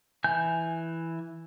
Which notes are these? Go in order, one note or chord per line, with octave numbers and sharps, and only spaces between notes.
E3 G#5 G6